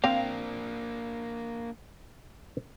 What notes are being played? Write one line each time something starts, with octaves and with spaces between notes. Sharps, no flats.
A#3 C4 D4 F5 G5